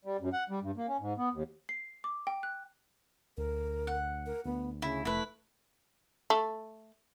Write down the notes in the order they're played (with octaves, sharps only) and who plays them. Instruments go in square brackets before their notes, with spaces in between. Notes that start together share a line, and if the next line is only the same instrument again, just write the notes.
[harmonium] G3
F#2
F#5
G3
G2
A#3
C#4
G#2
B3
D#2
[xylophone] C7
D6
G5
F#6
[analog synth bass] D2 [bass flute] A#4
[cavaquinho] F#5
[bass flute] A#4
[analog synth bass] D2 [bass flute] B3
[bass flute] C#3 [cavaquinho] E4
[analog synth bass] F1 [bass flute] A3 [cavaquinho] E4 B4
[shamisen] A3